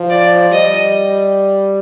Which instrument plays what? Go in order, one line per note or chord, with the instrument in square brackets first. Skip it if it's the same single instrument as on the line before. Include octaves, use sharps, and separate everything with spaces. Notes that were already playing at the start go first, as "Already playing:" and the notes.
Already playing: [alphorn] F3
[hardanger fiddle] D5
[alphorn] G3 [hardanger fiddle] D#5